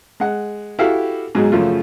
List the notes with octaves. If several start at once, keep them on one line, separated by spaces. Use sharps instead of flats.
G#3 F#5
E4 F#4 G4 A4 F5
G#2 B2 F#3 G#3
F#2 C#3 F3 A3 F4